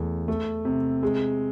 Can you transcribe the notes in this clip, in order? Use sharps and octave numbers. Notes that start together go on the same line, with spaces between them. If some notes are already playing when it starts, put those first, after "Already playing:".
Already playing: E2 A3
A3
C3
G#3